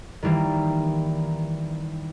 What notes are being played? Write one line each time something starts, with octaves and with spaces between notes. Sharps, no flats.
D#3 E3 G3 A#3